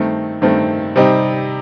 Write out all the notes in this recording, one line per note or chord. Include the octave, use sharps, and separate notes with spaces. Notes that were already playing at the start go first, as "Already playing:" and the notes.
Already playing: G2 D#3 A3 C4
G2 D#3 A3 C4
C3 G3 C4 D#4